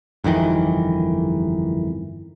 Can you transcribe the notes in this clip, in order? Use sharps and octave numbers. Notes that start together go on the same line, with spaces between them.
G1 F2 D#3 E3